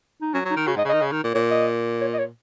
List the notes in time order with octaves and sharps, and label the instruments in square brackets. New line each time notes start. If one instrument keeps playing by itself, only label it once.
[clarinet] D#4
[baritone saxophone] F#3 [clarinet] C#4
[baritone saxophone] F#3
[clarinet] D#4
[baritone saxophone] D#3
[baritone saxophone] C#3 [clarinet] F#4
[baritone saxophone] G#2
[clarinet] D#5
[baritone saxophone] C#3
[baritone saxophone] D#3 [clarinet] D#5
[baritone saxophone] C#3
D#3
A#2
[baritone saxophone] A#2 [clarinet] C#5
[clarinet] D#5
C#5
D#5
C#5